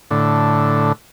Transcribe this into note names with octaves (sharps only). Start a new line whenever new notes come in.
A2 D3